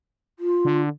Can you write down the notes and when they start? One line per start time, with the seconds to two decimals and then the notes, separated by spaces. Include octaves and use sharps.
0.39 F4
0.65 D3